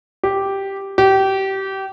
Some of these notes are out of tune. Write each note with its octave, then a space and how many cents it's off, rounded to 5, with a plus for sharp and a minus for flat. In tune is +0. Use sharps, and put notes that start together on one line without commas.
G4 -5
G4 -25